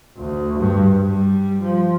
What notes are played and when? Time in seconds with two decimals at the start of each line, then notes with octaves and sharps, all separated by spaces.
0.17 D2
0.58 G2
1.05 G3
1.61 F3